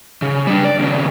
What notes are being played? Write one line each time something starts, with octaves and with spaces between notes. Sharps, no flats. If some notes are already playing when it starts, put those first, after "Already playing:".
C#3
G3 D4
D5
D#2 C#3